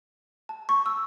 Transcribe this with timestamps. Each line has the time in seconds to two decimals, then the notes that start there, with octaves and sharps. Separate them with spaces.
0.49 A5
0.69 C#6
0.86 E6